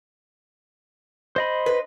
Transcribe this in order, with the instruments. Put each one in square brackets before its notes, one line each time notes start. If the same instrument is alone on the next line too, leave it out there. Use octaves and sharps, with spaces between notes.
[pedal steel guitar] C5 D#5 B5
[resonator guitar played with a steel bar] B4